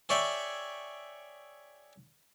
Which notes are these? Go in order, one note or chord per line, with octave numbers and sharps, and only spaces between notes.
G#4 C#5 D5 E5 G5